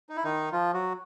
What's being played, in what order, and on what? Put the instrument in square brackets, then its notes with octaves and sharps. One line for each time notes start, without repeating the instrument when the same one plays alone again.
[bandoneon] D#4
E4
D#3 D#4
F3 F4
F#3 F#4